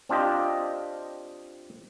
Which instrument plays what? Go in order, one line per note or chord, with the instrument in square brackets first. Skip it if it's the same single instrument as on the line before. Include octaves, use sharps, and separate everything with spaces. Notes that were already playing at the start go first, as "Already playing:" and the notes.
[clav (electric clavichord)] C4 D4 F4 G4 D#5